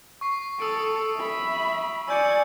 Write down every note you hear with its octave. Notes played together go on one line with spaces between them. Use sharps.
C#6 C7
A4 D#6 E6 D7
E5 B5
D5 G#5 E6 G6 C#7